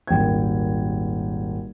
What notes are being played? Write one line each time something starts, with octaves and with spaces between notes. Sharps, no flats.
D#1 G#1 G5 G#6